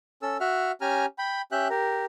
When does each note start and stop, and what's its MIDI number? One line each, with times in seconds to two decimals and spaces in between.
0.22 0.37 61
0.22 0.37 69
0.22 0.37 88
0.40 0.72 66
0.40 0.72 76
0.40 0.72 78
0.40 0.72 89
0.81 1.06 61
0.81 1.06 67
0.81 1.06 80
0.81 1.06 82
0.81 1.06 89
1.18 1.42 79
1.18 1.42 83
1.52 1.68 61
1.52 1.68 67
1.52 1.68 76
1.52 1.68 79
1.52 1.68 90
1.70 2.05 67
1.70 2.05 70